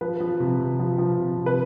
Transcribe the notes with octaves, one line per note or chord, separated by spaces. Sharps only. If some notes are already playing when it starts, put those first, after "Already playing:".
F3 B4
F3
C3
C3
F3
F3
C3
C3
B4